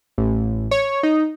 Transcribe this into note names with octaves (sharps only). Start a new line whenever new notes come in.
A1
C#5
D#4